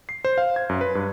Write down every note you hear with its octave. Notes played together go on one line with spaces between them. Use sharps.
C7
C5
F5
G#6
F#2
B4
G2